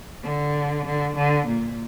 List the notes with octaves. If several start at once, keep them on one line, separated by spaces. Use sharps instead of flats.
D3
D3
D3
A#2